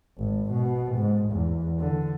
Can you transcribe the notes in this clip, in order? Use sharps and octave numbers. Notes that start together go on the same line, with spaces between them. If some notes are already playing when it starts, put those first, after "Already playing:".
G#1
B2
G#2
E2
D3